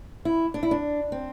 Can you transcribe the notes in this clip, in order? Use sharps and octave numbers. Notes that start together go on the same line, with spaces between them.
E4
D4
E4
D4
C4